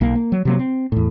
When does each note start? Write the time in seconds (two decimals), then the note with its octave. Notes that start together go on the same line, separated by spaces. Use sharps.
0.01 B1 A#3
0.15 A#3
0.32 F#3
0.45 C3 F#3 A#3
0.59 C4
0.92 E2 A2